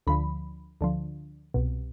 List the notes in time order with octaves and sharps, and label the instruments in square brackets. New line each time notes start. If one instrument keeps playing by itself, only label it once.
[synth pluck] D2 D3 F3 B5
D2 D3 F3
C2 B2